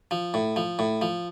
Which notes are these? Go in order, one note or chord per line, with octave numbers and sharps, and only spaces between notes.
F3
A2
F3
A2
F3